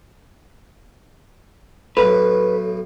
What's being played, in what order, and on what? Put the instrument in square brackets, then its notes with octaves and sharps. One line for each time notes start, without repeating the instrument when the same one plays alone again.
[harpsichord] B1 A2 [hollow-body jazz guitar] B4